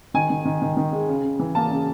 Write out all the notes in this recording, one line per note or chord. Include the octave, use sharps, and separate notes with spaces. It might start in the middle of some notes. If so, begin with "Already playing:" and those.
D#3 G#5
D#3
D#3
D#3
D#3
G#3
C#3
C#3
E3
A#3 A5
C#3